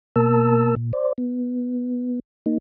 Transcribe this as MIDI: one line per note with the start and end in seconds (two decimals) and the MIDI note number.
0.16 0.75 47
0.16 0.75 58
0.16 0.75 70
0.16 0.75 81
0.16 0.75 88
0.76 0.92 46
0.93 1.13 72
0.93 1.13 74
1.18 2.20 59
2.46 2.58 58
2.46 2.58 63